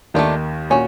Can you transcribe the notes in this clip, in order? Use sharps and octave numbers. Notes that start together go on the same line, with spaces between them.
D#2 D#3 A3 D4 F4
A#2 C#4 F#4